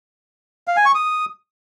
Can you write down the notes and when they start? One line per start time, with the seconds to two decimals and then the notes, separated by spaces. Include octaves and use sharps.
0.68 F5
0.77 G#5
0.86 C#6
0.95 D#6